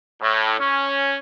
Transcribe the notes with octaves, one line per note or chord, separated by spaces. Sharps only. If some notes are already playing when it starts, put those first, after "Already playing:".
A2
C#4